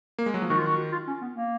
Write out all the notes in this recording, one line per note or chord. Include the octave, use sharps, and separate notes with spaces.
A#3
G#3
F#3
F3
D#3 F#4
F4
F#4
F4
C#4
B3
A#3